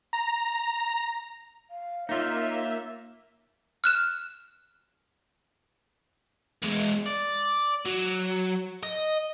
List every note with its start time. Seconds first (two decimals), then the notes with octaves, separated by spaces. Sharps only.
0.13 A#5
1.70 F5
2.09 A#3 D#4 F4 C#5 E5
3.84 F6 F#6 E7
6.63 E2 G#3
7.06 D5
7.86 F#3
8.83 D#5